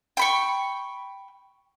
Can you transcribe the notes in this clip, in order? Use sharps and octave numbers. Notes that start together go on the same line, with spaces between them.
G5 B5 C#6